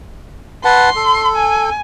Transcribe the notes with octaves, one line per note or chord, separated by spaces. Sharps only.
B4 F#5 A5 C6
A4
G#5